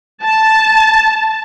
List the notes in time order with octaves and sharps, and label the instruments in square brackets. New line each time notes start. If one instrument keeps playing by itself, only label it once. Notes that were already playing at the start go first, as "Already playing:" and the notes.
[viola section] A5